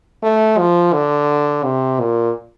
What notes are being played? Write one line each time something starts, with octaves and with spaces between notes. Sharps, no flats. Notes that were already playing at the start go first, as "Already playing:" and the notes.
A3
F3
D3
C3
A#2